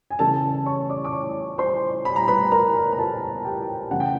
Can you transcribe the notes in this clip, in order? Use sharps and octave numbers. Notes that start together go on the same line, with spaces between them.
G#5
C#3 E3 A4 A5
C#5 C#6
D5 D6
D6
C#5 C#6
C5 C6
B5
A#5
B4 B5
A#4 A#5
A#5
A4 A5
G4 G5
C#3 E3 F#5
G5